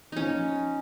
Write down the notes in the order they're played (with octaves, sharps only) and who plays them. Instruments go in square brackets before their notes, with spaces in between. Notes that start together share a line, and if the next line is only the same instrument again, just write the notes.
[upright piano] F3 [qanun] C#4 D#4